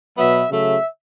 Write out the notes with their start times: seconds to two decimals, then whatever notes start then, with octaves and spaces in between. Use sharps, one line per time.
0.17 B2 F#3 B3 E5
0.50 C#3 F#3 A3 E5